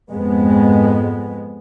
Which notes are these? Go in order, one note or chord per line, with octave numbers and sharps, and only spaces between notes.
F2 G#2 G#3 B3